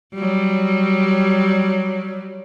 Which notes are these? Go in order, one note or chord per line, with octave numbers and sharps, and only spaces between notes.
F#3 G3